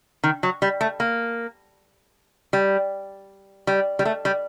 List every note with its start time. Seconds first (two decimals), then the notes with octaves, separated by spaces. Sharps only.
0.24 D#3
0.43 F#3
0.62 G3
0.81 A3
1.00 A#3
2.53 G3
3.67 G3
3.99 G3
4.05 A3
4.25 G3